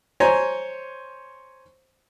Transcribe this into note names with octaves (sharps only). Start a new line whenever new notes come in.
C5 C#5 G#5 A#5